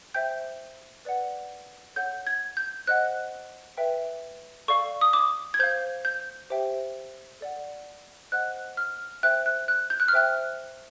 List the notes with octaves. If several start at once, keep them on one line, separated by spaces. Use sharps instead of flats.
C5 E5 G5 G6
B4 D5 F#5
A4 C#5 F#5 G6
G#6
G6
C5 D#5 F#5 F#6
B4 E5 G5
A4 D5 F5 C#6
D#6
D6
G#6
C5 F5 G6
G6
G4 C5 E5 G5
A4 D5 F#5
C5 D#5 F#5 F#6
F6
C5 E5 G5 F#6
F#6
F#6
G6
F#6
F6
C5 E5 G5 F#6